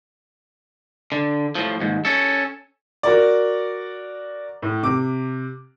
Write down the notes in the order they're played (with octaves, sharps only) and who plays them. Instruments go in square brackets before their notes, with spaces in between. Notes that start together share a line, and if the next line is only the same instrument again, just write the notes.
[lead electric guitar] D3
A2 F3
D#2 G#2
C#4 A4
[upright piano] F#4 A#4 D5
A2
C3 D6